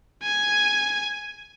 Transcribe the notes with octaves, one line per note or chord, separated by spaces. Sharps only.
G#5